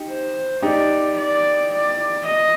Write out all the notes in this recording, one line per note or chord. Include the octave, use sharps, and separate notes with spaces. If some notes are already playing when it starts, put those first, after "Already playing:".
Already playing: D#4 G4
C5
D#4 G4 D5
D5
D5
D#5